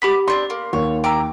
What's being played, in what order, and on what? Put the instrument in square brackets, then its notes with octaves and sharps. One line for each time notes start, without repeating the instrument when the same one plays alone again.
[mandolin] B3 D6 [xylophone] G4 B5 B6
[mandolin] C4 D4 D#4 [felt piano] C6
[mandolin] A#3
[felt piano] D#2 [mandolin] C#5
[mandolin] E4 A#5 D6 [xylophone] G5